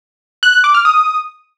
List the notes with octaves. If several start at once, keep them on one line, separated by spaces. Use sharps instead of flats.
F#6
F#6
D6
F6
D#6